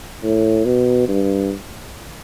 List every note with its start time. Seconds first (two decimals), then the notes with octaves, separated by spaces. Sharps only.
0.23 A2
0.65 B2
1.08 G2